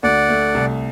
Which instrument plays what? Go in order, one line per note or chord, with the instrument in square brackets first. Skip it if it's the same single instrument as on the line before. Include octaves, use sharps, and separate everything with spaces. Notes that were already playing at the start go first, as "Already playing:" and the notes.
[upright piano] D2 [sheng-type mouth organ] D5 F#5
[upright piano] A3
C2